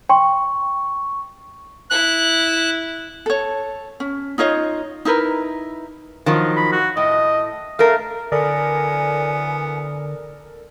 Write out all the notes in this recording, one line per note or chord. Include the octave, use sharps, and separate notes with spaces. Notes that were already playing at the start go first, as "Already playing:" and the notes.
G5 C6 C#6
E4 F#6
A4 C#5
C#4
D#4 F4 C#5 D#5
D#4 E4 A#4 B4
D#3 F3 F#3
B5
F#4
A2 D#5
A3 A#4 F5
D3 E3 F#3 B3 A4 A#4 D5 G#5